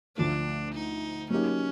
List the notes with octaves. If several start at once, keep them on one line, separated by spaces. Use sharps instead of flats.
D2 D3 F3 A3 D4
D#4
F#3 A#3 C#4 D#4 G4